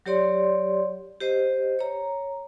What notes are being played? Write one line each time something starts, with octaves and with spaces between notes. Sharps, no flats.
F#3 G4 C#5 D5 C6
G4 C5 D#5
C#5 A#5